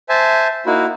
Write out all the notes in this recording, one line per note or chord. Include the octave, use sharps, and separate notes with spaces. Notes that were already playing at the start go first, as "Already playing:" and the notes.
C5 E5 G#5 A5
A#3 D#4 E4 F#4